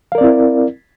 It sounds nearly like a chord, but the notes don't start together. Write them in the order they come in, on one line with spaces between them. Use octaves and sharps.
F5 A#4 D5 C4 E4